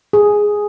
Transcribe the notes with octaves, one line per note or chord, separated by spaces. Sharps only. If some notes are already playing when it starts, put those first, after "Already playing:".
G#4